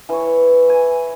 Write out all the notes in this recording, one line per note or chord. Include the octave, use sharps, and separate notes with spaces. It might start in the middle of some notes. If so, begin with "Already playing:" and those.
E3 C#5
G#5